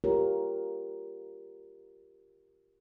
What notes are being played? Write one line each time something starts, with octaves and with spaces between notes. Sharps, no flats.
F4 G4 A#4 C#5